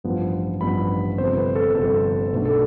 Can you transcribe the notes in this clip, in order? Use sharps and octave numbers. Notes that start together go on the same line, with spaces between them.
A1 G2 F3 B3
A1 G2 F3 B3 B5
G1 F2 C3 C5
B4
A4
G1 F2 C3 A4
B1 B2 A3 D4
A4